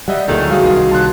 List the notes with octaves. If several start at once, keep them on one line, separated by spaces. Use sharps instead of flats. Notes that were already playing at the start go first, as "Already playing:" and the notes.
G3 D#5 E5 F#5
D2 A#2 D#3 F#3 F#4 G#4 A4
G3 F#4 G#4 F5
C2 D#3 F4
D#2 A5 C6 F#6